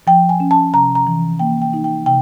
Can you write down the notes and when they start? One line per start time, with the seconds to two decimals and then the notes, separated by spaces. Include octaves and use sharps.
0.07 F3 G5
0.29 G#5
0.40 C#4
0.51 A5
0.73 C3 A#5
0.95 A#5
1.07 E3
1.39 A#3 G5
1.62 G5
1.73 D#4
1.84 G5
2.06 C3 G5